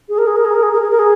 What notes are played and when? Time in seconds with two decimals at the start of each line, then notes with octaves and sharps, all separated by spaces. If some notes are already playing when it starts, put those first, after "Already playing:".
0.09 G#4
0.18 A#4
0.27 G#4
0.36 A#4
0.45 G#4
0.54 A#4
0.63 G#4
0.72 A#4
0.81 G#4
0.90 A#4
0.99 G#4